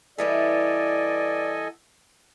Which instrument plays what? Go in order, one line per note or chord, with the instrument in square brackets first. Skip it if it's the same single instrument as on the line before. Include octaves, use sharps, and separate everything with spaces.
[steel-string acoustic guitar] E3 G3 B3 [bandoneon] A4 D#5 G#5 [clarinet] D5